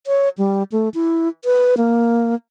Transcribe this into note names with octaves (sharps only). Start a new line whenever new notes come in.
C#5
G3
A3
E4
B4
A#3